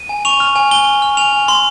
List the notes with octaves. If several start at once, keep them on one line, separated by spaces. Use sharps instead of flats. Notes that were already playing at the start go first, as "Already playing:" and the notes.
Already playing: D#7
G#5
C#6 F7
F6
G#5
G#5 G7
C#6
F6
G#5 F7
G#5
C6